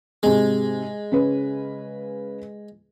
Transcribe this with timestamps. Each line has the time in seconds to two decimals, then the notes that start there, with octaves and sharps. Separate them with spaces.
0.23 G#2 C3 G#3
1.12 C#3 C#4 B4